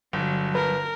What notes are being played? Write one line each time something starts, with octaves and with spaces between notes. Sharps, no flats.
G1 F#3
A#4 B4